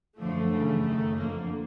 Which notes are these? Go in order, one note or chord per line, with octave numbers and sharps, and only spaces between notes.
F#2 D3 F3 A3
F#2 C#3 E3
F#2 D#3
F2 D3 F3 A#3